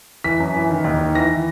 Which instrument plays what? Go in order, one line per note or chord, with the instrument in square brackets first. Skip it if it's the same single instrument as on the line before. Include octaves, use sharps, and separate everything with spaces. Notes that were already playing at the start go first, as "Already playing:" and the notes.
[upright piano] E3 B6
F#2
E3
D#3
D#2
D#3
E3 A#6
E3